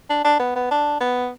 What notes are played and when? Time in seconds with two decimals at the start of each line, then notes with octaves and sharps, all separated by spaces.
0.10 D4
0.24 D4
0.40 B3
0.55 B3
0.71 D4
1.01 B3